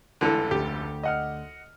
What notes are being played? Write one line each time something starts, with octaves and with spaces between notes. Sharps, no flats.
F1 C#2 D3 E3 A4
D2 G4
D#5 F#5 F6